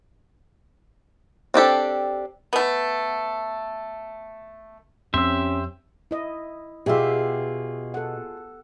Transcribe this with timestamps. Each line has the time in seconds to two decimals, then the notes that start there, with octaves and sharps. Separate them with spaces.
1.54 C4 D4 G4 A4
2.53 A3 B3
5.14 F2 C4 C#4 G4 E5 C6 E6
6.11 E4 D#5
6.86 B2 F4 G4 G#4 E5
7.94 A4 F#5